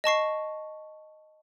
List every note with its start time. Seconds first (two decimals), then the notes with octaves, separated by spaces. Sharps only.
0.04 D#5 A5 C#6 C7